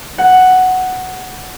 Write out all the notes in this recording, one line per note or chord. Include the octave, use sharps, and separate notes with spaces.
F#5